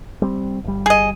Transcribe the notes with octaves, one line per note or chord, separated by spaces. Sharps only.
G3 C4
G1 G3
G#4 D#5